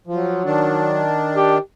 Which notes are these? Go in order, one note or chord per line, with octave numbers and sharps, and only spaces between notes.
F3 F#3
D#3 D4
G4